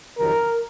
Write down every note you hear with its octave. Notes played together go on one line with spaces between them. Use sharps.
F2 C3 D#3 F#3 A#4